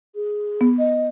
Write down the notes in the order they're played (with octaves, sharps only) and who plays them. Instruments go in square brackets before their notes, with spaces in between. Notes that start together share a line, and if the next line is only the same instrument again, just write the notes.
[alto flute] G#4
[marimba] B3
[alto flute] D#5